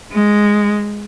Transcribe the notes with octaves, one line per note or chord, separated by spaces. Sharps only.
G#3